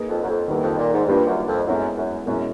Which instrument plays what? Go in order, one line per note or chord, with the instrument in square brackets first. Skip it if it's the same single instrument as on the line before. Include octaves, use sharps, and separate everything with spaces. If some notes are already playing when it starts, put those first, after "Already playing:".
Already playing: [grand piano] A#3 D#4 G#4 B4
[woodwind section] F2
F#2
F2
[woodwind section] E2 [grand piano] D#3 G3 A#3
[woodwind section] F2
A#2
G#2
[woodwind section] G2 [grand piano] G3 A#3 D4 F4
[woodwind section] F#2
F2
[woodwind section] F#2 [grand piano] G#3 B3 E4
[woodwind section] F#2
[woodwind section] F#2 [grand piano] B2 G#3 C#4 E4